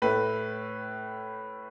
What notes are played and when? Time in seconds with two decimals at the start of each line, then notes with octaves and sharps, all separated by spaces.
0.02 A2 A3 B4